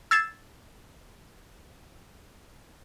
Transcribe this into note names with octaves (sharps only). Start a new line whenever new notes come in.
E6 G#6 A6 C7 E7